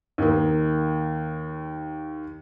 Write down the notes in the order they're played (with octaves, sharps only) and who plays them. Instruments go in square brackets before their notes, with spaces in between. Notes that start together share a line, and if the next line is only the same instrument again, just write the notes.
[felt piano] D#2 A#3